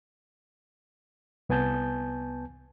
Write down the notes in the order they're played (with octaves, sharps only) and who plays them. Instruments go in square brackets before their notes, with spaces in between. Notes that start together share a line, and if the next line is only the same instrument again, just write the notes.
[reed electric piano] C2 B3 G#5 A5 G6